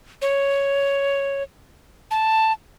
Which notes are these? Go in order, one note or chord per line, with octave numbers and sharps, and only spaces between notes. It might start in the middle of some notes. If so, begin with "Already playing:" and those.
C#5
A5